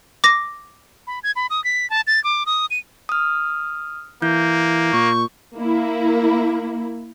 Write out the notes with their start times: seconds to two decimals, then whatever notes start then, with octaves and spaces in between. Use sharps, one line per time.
0.24 D6 A#6
1.07 B5
1.23 G#6
1.36 B5
1.50 D#6
1.64 B6
1.90 A5
2.07 A6
2.24 D6
2.46 D#6
2.71 D#7
3.09 D#6 F6
4.22 E3 A#3 G6
4.93 A#2 C#6
5.57 A#3 E4